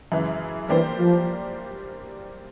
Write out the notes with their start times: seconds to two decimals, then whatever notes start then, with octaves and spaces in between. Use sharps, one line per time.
0.12 F#2 C#3 E3 G#3
0.69 E3 G3 A#3 D4 G4 C5
0.98 F3